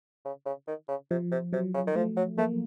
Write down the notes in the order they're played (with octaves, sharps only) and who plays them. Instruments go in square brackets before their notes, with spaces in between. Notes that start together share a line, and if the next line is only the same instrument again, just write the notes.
[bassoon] C#3
C#3
D#3
C#3
[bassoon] C3 [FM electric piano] F3
[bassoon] C3
[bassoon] C3 [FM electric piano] F#3
[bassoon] C#3
D#3
[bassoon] F3 [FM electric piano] A3
[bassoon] F#3
[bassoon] A3 [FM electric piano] A#3